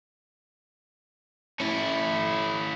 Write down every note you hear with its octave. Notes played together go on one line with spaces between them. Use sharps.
C#4 E4